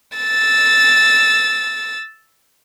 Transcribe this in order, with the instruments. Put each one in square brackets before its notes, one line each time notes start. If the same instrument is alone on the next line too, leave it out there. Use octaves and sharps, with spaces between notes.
[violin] E6 A6